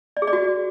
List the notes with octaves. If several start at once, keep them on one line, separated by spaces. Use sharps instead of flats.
D5
G#4
D5
F#4